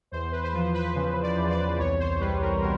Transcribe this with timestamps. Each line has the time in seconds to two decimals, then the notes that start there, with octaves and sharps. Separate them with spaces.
0.11 E2 C5
0.32 B4
0.43 C5
0.53 F3 B4
0.74 B4
0.95 C#3
1.22 D5
1.37 E2
1.50 D5
1.78 C2 C#5
1.99 C5
2.20 G3 B4
2.41 A#4
2.61 B2 A#4